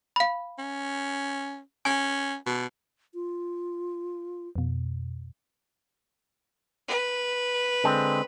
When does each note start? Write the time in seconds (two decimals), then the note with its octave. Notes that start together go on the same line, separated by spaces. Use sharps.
0.16 F5 B5
0.58 C#4
1.85 C#4 G#5
2.46 B2
3.14 F4
4.56 F2 B2
6.88 B4
7.84 D3 G#3 C4